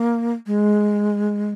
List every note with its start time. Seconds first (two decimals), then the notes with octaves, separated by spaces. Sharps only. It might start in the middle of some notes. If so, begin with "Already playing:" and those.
Already playing: A#3
0.47 G#3